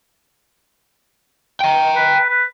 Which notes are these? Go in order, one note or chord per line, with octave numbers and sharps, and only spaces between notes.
G5 A#5
B4
B4